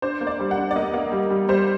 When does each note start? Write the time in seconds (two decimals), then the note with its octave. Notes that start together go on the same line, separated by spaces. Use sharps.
0.02 D4 C5
0.21 A#3
0.27 D5
0.40 G3
0.51 F#5
0.58 D4
0.71 D5
0.76 A#3 D#5
0.94 A#3
1.12 G3
1.30 G3
1.49 G3 C5